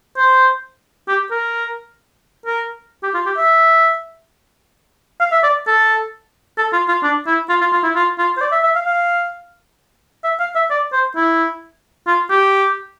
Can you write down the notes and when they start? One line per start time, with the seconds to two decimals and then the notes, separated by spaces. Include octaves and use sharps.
0.17 C5
1.08 G4
1.31 A#4
2.46 A#4
3.03 G4
3.14 F4
3.26 G4
3.38 E5
5.21 F5
5.32 E5
5.44 D5
5.67 A4
6.58 A4
6.73 F4
6.89 F4
7.03 D4
7.27 E4
7.49 F4
7.61 F4
7.73 F4
7.84 E4
7.96 F4
8.19 F4
8.37 C5
8.42 D5
8.52 E5
8.63 E5
8.75 F5
8.87 F5
10.24 E5
10.40 F5
10.55 E5
10.71 D5
10.93 C5
11.16 E4
12.07 F4
12.30 G4